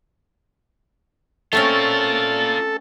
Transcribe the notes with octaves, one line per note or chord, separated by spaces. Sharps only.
A3 C4 C#4 F4 A4 A#4